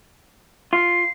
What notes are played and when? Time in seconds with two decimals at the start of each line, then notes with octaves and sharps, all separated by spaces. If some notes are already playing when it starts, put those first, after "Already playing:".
0.73 F4 C7